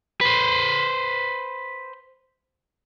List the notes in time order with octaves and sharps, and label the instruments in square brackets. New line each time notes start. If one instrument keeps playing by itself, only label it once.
[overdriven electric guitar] B4 C5